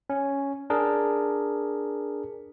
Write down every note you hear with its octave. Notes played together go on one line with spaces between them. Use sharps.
C#4
D4 G#4 A#4